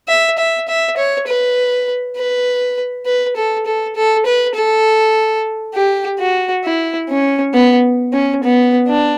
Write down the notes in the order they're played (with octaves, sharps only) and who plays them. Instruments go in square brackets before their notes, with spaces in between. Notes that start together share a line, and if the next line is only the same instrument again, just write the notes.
[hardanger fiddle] E5
E5
E5
C#5
B4
B4
B4
A4
A4
A4
B4
A4
G4
F#4
E4
C#4
B3
C#4
B3
D4